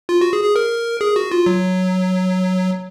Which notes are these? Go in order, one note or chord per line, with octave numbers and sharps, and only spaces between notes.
F4
F#4
G#4
G#4
A#4
G#4
F#4
F4
F#3